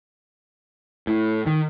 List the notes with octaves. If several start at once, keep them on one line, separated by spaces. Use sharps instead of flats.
A2
D#3